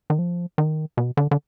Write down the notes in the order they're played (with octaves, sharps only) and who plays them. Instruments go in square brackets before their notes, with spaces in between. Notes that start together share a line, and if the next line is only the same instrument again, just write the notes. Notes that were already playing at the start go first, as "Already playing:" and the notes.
[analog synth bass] D#3
F3
D#3
B2
D3
D3